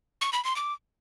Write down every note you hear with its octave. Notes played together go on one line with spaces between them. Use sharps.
C#6
B5
C6
D6